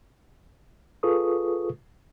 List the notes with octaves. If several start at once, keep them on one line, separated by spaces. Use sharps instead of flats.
F4 G#4 A4 B4 C#6 D#6